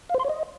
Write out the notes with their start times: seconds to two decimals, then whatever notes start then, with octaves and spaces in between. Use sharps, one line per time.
0.09 F5
0.14 C5
0.20 C6
0.25 C#5
0.30 D#5